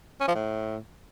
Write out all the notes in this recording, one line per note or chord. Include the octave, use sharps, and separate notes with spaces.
C#4
F3
A2